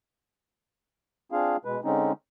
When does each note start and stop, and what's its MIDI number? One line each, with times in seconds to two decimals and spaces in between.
1.32 1.57 60
1.32 1.57 62
1.32 1.57 65
1.32 1.57 68
1.32 1.57 77
1.65 1.80 47
1.65 1.80 56
1.65 1.80 71
1.84 2.12 50
1.84 2.12 56
1.84 2.12 60
1.84 2.12 61
1.84 2.12 63